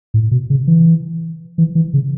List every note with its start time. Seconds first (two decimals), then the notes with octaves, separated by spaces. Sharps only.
0.14 A2
0.31 B2
0.50 C#3
0.67 E3
1.58 E3
1.75 E3
1.94 C#3